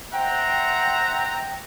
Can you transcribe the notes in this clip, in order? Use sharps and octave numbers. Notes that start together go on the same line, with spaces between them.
C5 E5 F#5 G5 A#5